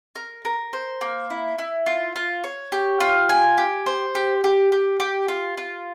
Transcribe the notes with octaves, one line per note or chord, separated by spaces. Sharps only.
A#4
A#4
C5
A#3
E4
E4
F4
F4
C#5
G4
F4
G#5
G4
C5
G4
G4
G4
G4
F4
F4